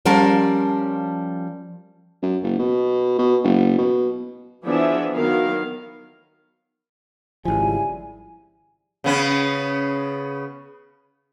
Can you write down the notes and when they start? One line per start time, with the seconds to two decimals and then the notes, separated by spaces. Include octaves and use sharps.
0.05 F3 G3 C#4 A#4 F5 A5
2.23 F#2
2.43 F#1
2.59 B2
3.19 B2
3.44 F#1
3.78 B2
4.66 E3 F3 B3 D4 G#4 E5
5.15 D#3 F#3 B3 A#4 F5
7.45 G#1 C#3 F3 G3 E4 G#5
9.04 C#3 B3 C#4